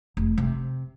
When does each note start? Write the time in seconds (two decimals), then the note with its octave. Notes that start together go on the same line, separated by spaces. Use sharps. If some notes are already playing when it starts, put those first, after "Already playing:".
0.17 F1
0.38 C3